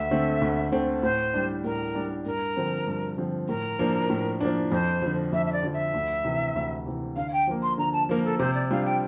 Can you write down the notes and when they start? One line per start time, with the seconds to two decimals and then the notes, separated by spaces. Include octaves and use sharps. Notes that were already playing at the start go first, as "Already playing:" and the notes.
Already playing: D2 E5
0.11 D3 A3 C4
0.42 D2
0.72 D3 A3 C4
1.03 A2 C5
1.34 G3 D4
1.64 A2 A#4
1.95 G3 D4
2.26 G2 A#4
2.56 D3 F3 C4
2.87 G2
3.18 D3 F3 C4
3.48 A2 A#4
3.79 F3 A#3 D4
4.10 A2
4.40 F3 A#3 D4
4.71 F2 C5
5.02 D3 F3
5.33 F2 E5
5.46 E5
5.53 D5
5.63 D3 F3
5.74 E5
5.94 D2
6.25 C3 E3
6.55 D2
6.86 C3 E3
7.16 D3 F5
7.33 G5
7.47 F3 A#3
7.63 C6
7.78 D3 A#5
7.93 A5
8.09 F3 A#3 A#4
8.25 A4
8.39 C3 C5
8.55 D5
8.71 G3 D4 F4 F5
8.86 G5